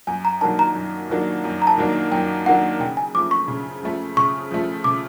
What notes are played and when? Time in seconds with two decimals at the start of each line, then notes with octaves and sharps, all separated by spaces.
0.07 F#2 G#5
0.25 A#5
0.41 D#3 F#3 A#3 D4 A5
0.59 A#5
0.75 F#2
1.10 D#3 F#3 A#3 D4
1.44 F#2
1.62 A#5
1.67 A5
1.78 D#3 F#3 A#3 D4
2.12 F#2 G5
2.46 D#3 F#3 A#3 D4 F#5
2.80 C#3 G5
2.97 G#5
3.14 F3 A3 D6
3.31 C#6
3.48 C#3
3.83 F3 A3
4.17 C#3 C#6
4.51 F3 A3
4.84 C#3 D6